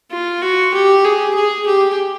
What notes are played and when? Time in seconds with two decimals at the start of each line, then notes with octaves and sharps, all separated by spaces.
0.11 F4
0.42 F#4
0.74 G4
1.05 G#4
1.35 G#4
1.66 G4